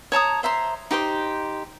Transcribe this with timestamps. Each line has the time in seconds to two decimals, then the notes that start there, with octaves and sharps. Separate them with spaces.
0.12 C#5 A5 A#5 D#6
0.43 C5 E5 A#5 C6
0.91 D#4 G4 C5 C6